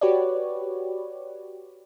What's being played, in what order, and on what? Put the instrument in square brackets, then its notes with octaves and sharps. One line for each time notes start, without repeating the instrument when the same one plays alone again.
[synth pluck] F#4 G4 B4 C#5 D5